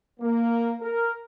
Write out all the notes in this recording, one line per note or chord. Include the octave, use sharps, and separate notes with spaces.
A#3
A#4